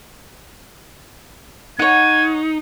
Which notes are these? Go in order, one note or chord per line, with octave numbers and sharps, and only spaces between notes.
D#4 C#5 F#5 G#6